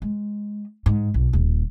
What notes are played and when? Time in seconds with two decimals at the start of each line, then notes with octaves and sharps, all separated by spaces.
0.02 G#3
0.86 G#2
1.14 B1
1.33 D#1